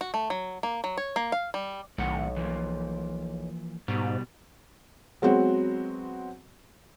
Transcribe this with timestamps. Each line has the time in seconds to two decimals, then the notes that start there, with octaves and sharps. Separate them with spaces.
0.01 F#4
0.14 A3
0.30 F#3
0.63 A#3
0.84 F#3
0.97 C#5
1.16 A#3
1.32 F5
1.54 G3
1.98 B1 A2 D#3 F#5
2.36 E3 F3 A#3
3.88 G#2 B2 G3
5.22 F#3 G#3 B3 C4 F#4